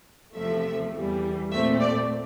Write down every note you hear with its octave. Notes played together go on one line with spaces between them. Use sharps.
E2 C3 F3 A3 E5
E2 E3 G3
A#2 A3 C4 E5
D5